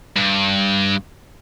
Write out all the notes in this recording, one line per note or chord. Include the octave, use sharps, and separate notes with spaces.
G2